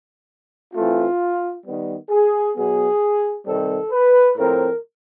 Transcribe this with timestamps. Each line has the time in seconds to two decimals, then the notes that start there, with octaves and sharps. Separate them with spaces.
0.74 E3 A3 C4 F4
1.65 D#3 G3 B3
2.10 G#4
2.56 B2 F#3 B3 G#4
3.46 C3 D#3 G3 C4 A4
3.91 B4
4.36 A2 F3 A3 C4 A#4